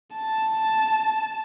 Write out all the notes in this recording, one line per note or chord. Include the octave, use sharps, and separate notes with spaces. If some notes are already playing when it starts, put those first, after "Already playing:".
A5